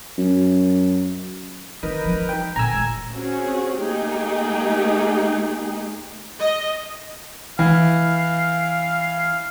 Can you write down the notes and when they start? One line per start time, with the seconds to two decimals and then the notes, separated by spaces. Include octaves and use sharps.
0.18 F#2
1.83 D#3 D#4 A#4 B4
2.05 F3 G3
2.29 G5
2.56 A#2 D3 G#5 A#5 E6
2.72 A3 F4
3.12 C4 C#4 F#4 G#4
3.76 A3 A#3 D#4 G4 G#4 G5
6.39 D#5
7.59 E3 F5